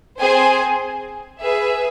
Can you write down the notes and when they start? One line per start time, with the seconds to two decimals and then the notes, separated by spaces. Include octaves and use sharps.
0.19 C4 G#4 C5 G#5
1.41 G#4 B4 E5